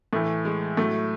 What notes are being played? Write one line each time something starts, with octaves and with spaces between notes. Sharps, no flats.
A2 E3 A3
G#3
A2 F#3 A3